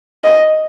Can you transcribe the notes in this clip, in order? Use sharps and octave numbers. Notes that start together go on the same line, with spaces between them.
D#5